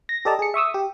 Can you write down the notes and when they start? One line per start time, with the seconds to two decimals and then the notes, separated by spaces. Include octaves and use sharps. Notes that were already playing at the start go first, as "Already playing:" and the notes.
0.09 A#6
0.25 G4 A4 D5 D#5 A5 A#5
0.39 G#4 C#7
0.54 E5 C#6 D#6 E6
0.74 G4